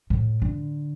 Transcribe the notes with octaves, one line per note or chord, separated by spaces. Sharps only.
A2
D3